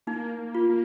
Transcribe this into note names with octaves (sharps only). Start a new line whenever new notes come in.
A#3 D#4
A#3
F4
A#3